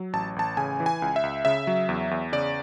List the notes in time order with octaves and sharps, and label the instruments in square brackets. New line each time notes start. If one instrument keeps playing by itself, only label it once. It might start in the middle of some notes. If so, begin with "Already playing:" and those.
Already playing: [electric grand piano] F#3
A1 A5
A1 A5
C#3 G#5
E3
G#5
C#2
E5
C#2
C#3 E5
F#3
E2
E2
C#3 D5